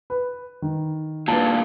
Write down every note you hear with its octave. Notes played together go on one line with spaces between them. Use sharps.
B4
D#3
G2 A#2 B4 A5